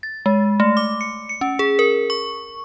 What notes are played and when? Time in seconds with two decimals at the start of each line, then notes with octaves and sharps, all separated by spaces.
0.03 A6
0.26 G#3
0.60 A3
0.77 D6
1.01 C#7
1.29 C#7
1.41 C#4
1.59 G#4
1.79 A#4
2.10 C#6